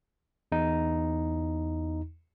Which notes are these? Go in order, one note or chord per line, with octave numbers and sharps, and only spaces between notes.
E2 D#4